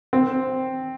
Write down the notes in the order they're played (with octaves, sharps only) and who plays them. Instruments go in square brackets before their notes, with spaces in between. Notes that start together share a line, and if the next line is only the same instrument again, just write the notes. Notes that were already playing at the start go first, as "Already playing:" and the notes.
[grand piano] C4